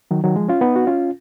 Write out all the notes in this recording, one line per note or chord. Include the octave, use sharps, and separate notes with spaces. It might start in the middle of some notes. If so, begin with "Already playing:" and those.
D#3 F#3
D#3 F#3
F3 G#3
C#4 F4
B3 D#4
F#4
C#4 F4